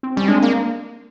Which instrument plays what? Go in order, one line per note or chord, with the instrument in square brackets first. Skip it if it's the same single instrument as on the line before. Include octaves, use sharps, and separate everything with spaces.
[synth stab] C4
[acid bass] G3 [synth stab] C#4
[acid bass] G#3 [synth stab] C4 D4
[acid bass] A#3